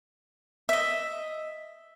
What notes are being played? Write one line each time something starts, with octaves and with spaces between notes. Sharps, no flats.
D#5 E5